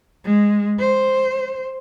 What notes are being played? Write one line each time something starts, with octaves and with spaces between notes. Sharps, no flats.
G#3
C5